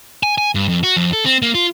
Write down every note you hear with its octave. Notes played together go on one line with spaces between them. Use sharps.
G#5
G#5
G2
F2
F#4
F2
A4
C4
A#3
F4